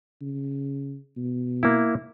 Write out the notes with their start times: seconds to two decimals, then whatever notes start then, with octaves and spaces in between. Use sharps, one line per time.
0.22 C#3
1.17 B2
1.63 A#3 E4